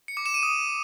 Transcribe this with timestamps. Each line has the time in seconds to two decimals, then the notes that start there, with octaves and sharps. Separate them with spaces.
0.08 C#7
0.17 D6
0.26 E7
0.34 D#7
0.43 D#6